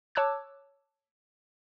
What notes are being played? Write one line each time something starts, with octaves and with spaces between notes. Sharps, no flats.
C#5 A5 D6 E6 F#6 G#6